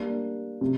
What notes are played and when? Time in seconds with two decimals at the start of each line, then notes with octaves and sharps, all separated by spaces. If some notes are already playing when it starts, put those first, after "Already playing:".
Already playing: G3 A#3 D4
0.61 C3